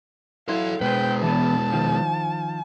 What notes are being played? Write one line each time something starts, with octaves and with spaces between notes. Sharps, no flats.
F#3 E4 A4 F5 C6
B2 G#3 B4 C5 G5
E3 B3 A5
D#3 F3